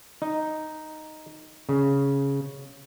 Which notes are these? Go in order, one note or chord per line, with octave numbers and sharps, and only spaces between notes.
D#4
C#3